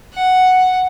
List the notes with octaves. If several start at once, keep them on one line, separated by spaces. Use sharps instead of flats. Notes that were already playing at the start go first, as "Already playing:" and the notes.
F#5